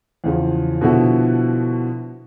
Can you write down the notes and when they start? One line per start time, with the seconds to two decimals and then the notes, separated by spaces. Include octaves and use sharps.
0.24 E2 C#3 F3
0.81 B2 D3 F3 B3 E4 F#4